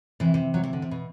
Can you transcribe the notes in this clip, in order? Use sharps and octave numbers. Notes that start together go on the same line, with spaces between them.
C3 E3
C3
F#3
E3
D3
C3
B2